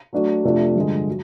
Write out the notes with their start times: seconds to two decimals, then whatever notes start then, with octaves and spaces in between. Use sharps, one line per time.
0.13 F#3 A3 D4 F#4
0.44 F2 C3 F3 A3 D4
0.76 G2 D3 F3 G#3
1.07 F#3